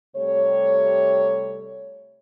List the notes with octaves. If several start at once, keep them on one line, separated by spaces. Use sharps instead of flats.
C3 G3 A3 C#5